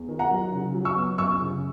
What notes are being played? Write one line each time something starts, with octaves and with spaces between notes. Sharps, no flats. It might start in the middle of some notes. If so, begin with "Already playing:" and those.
Already playing: E2
D#3
F#5 A#5
F#3
C#3
F#3
C#6 E6
B3
F#2 C#6 E6
C#3